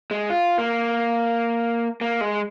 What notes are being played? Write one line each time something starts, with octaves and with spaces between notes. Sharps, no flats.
G#3
F4
A#3
A#3
G#3